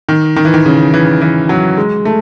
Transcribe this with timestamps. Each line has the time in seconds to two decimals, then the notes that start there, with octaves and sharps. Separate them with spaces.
0.09 D#3
0.36 D#3
0.45 E3
0.54 D#3
0.66 C#3
0.94 E3
1.22 E3
1.49 F#3
1.77 G#3
2.05 A3